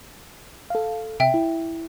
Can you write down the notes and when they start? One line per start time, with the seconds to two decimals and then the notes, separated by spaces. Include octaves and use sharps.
0.70 A4 F5
1.20 C3 E5 G5
1.34 E4